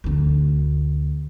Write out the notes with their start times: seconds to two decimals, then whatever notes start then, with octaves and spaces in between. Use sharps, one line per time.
0.04 D2 D4